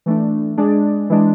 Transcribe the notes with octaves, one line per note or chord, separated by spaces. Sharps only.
E3 A3 D4
G#3 D4 G#4 D5
E3 G#3 D4